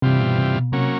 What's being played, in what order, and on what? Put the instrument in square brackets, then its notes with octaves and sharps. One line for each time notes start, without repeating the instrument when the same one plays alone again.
[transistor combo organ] G2 E3 G3 C4 F4 [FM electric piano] C3
[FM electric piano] B2
C3
B2
[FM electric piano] C3 [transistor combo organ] F#3 A#3 C#4